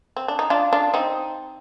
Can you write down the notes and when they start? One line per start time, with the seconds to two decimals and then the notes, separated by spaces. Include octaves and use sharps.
0.17 C4
0.28 D4
0.39 D#4
0.50 D4 F4
0.73 D4 F4
0.94 C4 D#4